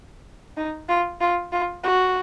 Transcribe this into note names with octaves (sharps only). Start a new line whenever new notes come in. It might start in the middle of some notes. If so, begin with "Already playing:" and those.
D#4
F4
F4
F4
F#4